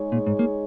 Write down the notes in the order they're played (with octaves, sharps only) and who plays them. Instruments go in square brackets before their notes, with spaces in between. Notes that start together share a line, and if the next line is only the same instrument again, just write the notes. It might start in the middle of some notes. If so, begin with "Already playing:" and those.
Already playing: [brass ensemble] G#3 D#4 G#4 C#5
[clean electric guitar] A#2
G#2
A#3